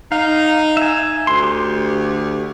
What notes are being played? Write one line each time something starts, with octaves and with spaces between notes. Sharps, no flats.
D#4 F5
E5 G#5
D2 C6
G4